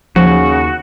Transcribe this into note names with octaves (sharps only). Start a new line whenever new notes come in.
D#2 C#3 F3 F#4